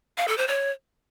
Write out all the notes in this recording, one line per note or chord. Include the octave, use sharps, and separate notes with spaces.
F5
A4
C5
C#5